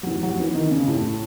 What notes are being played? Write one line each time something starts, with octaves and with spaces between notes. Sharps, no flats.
F#3
E3
F#3
E3
D#3
C#3
A2